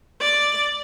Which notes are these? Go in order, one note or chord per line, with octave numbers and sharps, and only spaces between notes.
D5